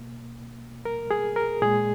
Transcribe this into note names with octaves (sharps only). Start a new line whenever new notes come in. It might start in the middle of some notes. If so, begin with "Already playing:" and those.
Already playing: B2 A#3
A#4
G#4
A#4
A#2 G#3 G#4